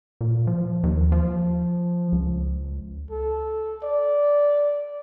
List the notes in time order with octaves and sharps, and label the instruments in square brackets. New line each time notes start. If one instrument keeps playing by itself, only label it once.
[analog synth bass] A#2
F3
D#2
F3
C#2
[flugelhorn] A4
D5